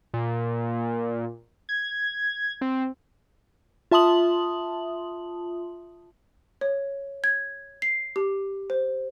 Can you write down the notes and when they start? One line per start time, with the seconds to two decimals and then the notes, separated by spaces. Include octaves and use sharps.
0.14 A#2
1.69 G#6
2.61 C4
3.91 F4 E5 A5 C6 D#6 F#7
6.61 C#5
7.24 G#6
7.82 C7
8.16 G4
8.70 C5